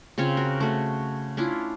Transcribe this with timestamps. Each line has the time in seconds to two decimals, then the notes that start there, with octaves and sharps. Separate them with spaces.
0.18 C#3 C4 F4 C#5
0.37 F#4 A#4
0.60 A3 F#4
1.37 C#4 D4 E4 F4